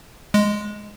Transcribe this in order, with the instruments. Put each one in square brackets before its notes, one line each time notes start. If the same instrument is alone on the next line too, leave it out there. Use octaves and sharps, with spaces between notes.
[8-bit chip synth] G#3